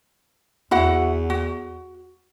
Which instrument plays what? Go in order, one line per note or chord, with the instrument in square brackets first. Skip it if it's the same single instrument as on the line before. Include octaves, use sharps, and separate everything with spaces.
[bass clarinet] E2 [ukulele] E4 F#4 F#5
[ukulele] F#4